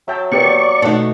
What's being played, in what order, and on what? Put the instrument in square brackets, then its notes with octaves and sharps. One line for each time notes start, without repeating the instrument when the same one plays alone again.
[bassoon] F#3 [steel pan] E5 G5 A5
[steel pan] A#3 B3 G4 [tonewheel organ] D5 C#6
[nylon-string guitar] B2 A3 [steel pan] D#4 F#5 A5